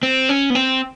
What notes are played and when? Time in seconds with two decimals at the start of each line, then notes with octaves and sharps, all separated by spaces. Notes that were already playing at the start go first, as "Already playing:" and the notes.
0.03 C4
0.29 C#4
0.50 B3
0.55 C4